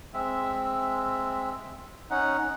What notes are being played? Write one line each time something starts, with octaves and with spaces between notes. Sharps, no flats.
G#3 C4 E5
C#4 D#4 F#5